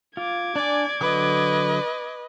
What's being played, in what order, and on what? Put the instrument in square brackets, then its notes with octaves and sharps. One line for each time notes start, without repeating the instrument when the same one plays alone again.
[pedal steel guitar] F4 [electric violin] D6 G#6
[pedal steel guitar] D4 G#5 [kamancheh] D5
[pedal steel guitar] D3 F#3 D#6 [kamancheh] B4 D#5